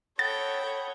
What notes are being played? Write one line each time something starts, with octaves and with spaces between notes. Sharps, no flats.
A4 C#5 F#5 G5 B5 D#6 A6